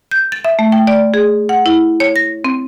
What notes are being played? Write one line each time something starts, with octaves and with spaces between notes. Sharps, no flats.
G6
A6
E5
A3
G5
D5
G#4
F#5
E4
C#5
A#6
C4